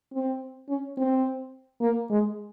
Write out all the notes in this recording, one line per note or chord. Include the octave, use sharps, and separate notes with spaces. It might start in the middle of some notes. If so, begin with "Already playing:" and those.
C4
C#4
C4
A#3
G#3